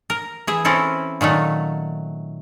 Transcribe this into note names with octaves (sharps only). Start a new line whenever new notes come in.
A#4
E3 G#4 E5
C4 C#4 E4 A4
A#2 D#3 F#3 A3